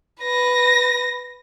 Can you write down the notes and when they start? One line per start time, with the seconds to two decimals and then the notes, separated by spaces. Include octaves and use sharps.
0.23 B4 A#6